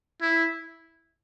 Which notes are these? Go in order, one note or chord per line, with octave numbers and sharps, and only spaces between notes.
E4